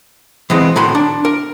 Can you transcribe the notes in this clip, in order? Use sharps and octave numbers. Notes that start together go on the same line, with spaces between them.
E3 G#3 B3 C4
A2 D#3 F#4 B5 C6
D4
A#4